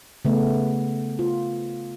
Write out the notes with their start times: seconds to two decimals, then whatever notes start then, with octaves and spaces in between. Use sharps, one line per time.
0.25 C#3 A3 B3
1.19 F4